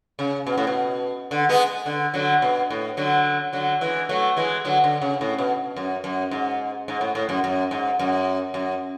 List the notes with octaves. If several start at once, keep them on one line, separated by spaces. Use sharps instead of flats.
C#3
B2
A2
B2
D3
G#3 B3
D3
D3 F#3
B2
A2
D3 F#3
D3 F#3
E3 G#3
F#3 A3
E3 G#3
D3 F#3
D3
C#3
A2
B2
F#2
F#2
G#2
G#2
A2
A2
F#2
F#2
G#2
F#2
F#2